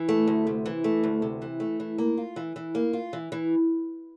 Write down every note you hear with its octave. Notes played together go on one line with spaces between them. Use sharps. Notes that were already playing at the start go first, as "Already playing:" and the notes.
Already playing: E3
A3
D2
C3
E3
A3
D2
C3
E3
A3
E3
A#3
F4
E3
E3
A#3
F4
E3
E3